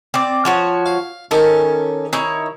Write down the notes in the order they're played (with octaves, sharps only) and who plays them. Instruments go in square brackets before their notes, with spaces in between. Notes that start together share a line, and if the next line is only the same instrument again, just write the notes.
[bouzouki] C4 D5
F3 F#4 C#5
[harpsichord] F5
[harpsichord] D#3 G4 [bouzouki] C#4 A4
[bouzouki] D#4 E4 C#5